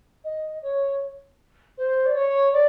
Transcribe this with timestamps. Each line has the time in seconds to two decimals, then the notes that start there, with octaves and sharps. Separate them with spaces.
0.24 D#5
0.62 C#5
1.77 C5
2.05 D5
2.15 C#5
2.53 D5